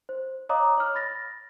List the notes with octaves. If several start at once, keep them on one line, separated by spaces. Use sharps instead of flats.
C5
C#5 D#5 F5 A#5 D6 D#6
C#5 F6
B5 A6 A#6